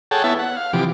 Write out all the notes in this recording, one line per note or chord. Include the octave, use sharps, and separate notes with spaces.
G#4 A4 C#5 F#5 G5 A5
B3 E4 C#5 E5 A5
F#5
F5
C3 E3 F3 G4 D6